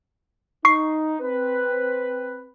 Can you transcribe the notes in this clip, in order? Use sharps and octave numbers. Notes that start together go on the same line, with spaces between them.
D#4 C#6 C7
C4 B4